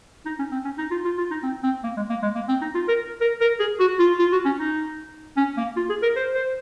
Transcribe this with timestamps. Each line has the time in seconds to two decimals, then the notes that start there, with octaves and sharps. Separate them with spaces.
0.26 D#4
0.39 C#4
0.52 C4
0.65 C#4
0.78 D#4
0.91 F4
1.05 F4
1.18 F4
1.31 D#4
1.43 C4
1.63 C4
1.84 A#3
1.97 G#3
2.09 A#3
2.23 G#3
2.35 A#3
2.49 C4
2.61 D#4
2.75 F4
2.88 A#4
3.21 A#4
3.41 A#4
3.60 G#4
3.80 F#4
4.00 F4
4.19 F4
4.32 F#4
4.45 C#4
4.59 D#4
5.37 C#4
5.57 A#3
5.76 F4
5.90 G#4
6.03 A#4
6.16 C5
6.35 C5